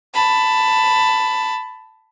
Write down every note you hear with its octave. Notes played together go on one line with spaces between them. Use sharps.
A5 B5